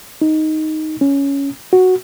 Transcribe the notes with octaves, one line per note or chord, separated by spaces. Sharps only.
D#4
C#4
F#4